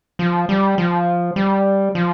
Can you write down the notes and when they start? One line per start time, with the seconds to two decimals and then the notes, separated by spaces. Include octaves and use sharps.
0.19 F3
0.49 G3
0.78 F3
1.36 G3
1.95 F3